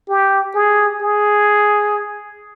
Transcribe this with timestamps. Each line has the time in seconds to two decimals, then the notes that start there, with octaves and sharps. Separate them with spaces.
0.09 G4
0.55 G#4
1.02 G#4